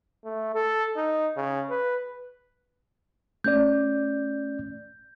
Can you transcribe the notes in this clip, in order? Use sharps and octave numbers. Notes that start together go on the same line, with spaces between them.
A3
A4
D#4
C#3
B4
A3 C#4 D5 G6